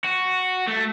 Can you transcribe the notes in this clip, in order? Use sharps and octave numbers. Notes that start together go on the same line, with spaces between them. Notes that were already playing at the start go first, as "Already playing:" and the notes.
F#4
A3